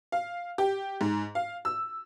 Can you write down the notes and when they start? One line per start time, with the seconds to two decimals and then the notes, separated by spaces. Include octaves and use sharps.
0.12 F5
0.58 G4
1.01 G#2
1.35 F5
1.65 E6